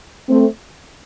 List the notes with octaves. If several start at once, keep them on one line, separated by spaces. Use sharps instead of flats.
A3 C4